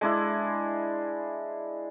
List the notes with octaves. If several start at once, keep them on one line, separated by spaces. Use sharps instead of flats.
G#3 D4 E4